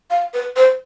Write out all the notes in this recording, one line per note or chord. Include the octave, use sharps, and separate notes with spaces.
F5
B4
C5